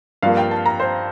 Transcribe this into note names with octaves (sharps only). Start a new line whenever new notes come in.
G2 F3 A#3 F5
G5
A5
A#5
C5